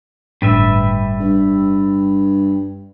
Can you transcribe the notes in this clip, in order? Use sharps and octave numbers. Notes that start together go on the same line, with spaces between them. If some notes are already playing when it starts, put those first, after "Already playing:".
G1 A2 G3 D4 B4 E5
G2